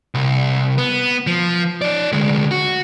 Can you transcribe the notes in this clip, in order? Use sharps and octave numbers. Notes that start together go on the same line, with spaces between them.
C2
B3
F3
D#4 D5
D2 G#3
F#4